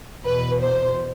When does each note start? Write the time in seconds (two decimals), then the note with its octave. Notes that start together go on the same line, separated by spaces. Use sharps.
0.24 E2 B2 B4
0.61 C5